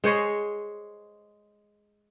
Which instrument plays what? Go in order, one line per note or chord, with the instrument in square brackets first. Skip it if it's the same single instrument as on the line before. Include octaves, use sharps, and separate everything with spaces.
[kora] G#3 C5 C#5 D#5